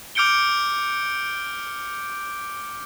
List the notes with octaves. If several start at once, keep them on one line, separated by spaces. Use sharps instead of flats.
D6 F6 G6 C#7 D7 G7